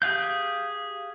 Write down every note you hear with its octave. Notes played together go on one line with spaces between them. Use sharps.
G4 G#4 F5 G6